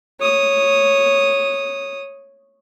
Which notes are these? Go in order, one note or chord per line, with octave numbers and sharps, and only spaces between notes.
C#5 D#6